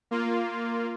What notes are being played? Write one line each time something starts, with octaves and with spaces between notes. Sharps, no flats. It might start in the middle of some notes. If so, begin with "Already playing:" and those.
A#3 F4